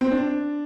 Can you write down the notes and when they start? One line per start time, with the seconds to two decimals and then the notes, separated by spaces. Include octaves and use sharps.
0.01 C4
0.12 D4